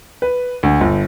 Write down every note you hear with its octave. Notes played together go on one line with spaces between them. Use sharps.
B4
D2
G1